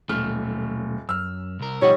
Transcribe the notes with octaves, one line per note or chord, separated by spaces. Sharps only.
D#1 B1 G#2 A3 F6
F#2 E6 F6
C2 A#4
B2 F3 G3 D#4 C#5 F#5